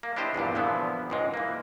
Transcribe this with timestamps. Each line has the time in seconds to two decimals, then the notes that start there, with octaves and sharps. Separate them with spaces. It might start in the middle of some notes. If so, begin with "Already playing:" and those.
0.03 A#3
0.16 D4 E4 G4 C5 D#5
0.34 E2 G2 A#2 D4
0.55 A#2 D3 E3 F3 B3 E4
1.10 C#2 G#2 G#3
1.34 E3 A#3